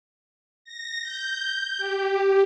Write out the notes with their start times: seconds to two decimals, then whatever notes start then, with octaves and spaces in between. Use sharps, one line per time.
0.65 A#6
1.03 G6
1.78 G4